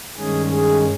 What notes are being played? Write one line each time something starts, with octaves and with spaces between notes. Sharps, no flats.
G2 D#3 G#3 C#4 G#4
G#4